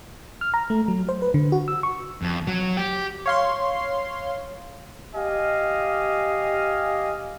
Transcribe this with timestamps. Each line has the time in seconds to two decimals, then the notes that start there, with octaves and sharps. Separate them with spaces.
0.41 F6
0.54 A#5
0.70 A3
0.88 F#3
1.09 C5
1.22 B4
1.34 D3
1.52 F#4
1.68 E6
1.83 C#6
2.22 F2
2.47 F#3
2.77 G4
3.26 C#5 F5 C6
5.15 G4 D#5 F5 G#5